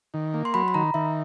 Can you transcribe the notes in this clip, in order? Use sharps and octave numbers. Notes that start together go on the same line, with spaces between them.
D#3
A#3
C6
F#3 B5
B5
D#3 A#5
D#3 E5